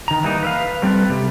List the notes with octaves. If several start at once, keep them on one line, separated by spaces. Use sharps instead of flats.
D#3 A#5
E3 G3 A#3 D#4
B4 E5 F5
F#3 G3 C4 A4 B4
C3 G3